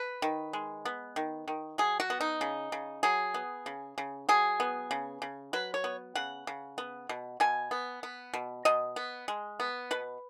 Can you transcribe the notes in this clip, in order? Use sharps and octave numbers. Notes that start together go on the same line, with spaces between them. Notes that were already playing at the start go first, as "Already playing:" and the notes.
Already playing: B4
D#3
G#3
B3
D#3
D#3
F#3 G#4
F#4
B3
D#4
C#3
C#3
F#3 G#4
B3
C#3
C#3
F#3 G#4
B3
C#3
C#3
F#3 B4
C#5
B3
C#3 F#5
C#3
B3
B2
B2 G#5
B3
B3
B2
B2 D#5
B3
G#3
B3
B2 B4